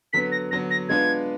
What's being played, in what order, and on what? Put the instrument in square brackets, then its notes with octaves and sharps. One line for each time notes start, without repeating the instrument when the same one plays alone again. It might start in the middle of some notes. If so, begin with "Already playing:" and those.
[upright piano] D3 F#3 B3 [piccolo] B6
[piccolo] A#6
[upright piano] D3 F#3 B3 [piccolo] A#6
[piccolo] A#6
[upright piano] G#3 B3 D4 F4 B4 [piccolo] G#6